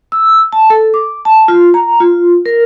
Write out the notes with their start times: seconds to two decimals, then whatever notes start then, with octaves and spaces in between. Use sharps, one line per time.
0.12 E6
0.53 A5
0.70 A4
0.94 D6
1.25 A5
1.48 F4
1.74 A#5
2.00 F4
2.46 A#4